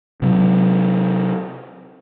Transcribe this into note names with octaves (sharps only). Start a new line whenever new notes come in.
C3 F#3